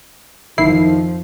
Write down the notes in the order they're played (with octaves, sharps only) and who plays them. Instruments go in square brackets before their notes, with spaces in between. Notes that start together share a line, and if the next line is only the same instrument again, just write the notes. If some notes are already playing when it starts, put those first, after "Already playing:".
[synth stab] G1 E4 C7 [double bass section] F2 F3 [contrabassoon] D#3